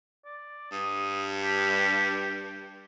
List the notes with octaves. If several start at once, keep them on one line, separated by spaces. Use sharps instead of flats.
D5
G2 D#6
G4